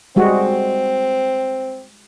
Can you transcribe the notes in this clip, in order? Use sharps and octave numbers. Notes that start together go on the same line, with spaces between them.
G3 G#3 C4 F#4